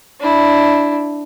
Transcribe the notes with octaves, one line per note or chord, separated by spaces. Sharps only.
D4 E4